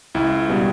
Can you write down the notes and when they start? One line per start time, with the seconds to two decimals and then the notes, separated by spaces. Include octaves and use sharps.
0.15 C#2 E4
0.48 B2 G3